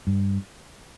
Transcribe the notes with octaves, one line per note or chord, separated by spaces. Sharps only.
G2